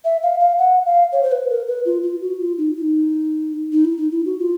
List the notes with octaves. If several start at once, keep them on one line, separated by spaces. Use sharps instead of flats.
E5
F5
F5
F#5
F5
C#5
C5
B4
A#4
B4
F4
F4
F#4
F4
D#4
E4
D#4
D#4
E4
D#4
E4
F#4
F4